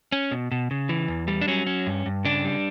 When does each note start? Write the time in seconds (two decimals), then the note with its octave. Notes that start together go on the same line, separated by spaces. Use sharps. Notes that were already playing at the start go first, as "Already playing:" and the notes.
0.12 C#4
0.31 B2
0.52 B2
0.71 C#3
0.89 E3
1.08 E2
1.28 G3
1.41 D4
1.48 F#3 C#4
1.67 C#4
1.87 G2
2.06 G2
2.25 C#3 D4
2.45 G3